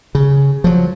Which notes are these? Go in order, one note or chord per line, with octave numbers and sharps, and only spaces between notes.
C#3
F3 F#3